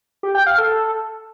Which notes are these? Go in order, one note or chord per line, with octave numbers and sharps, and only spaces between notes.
G4
G5
F5
A4